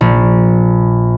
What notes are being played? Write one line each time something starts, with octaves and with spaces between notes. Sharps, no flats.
A#1